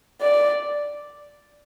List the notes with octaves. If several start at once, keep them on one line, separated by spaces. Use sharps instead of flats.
D5